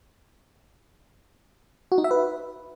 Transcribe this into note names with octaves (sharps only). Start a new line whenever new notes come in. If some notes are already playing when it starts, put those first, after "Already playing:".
F#4
D#4
E5
B4